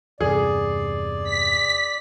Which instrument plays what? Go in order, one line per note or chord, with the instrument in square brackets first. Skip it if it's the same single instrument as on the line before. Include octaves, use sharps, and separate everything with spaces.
[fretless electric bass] E2 G2 C3 [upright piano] G#4 [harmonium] D5
[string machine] B6